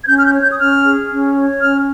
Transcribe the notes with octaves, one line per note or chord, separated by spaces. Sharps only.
G#6
C#4 G6
F6
G6
C#5
G6
D#6
C#4 F6
G#4
C#4
C#5
C#4 F6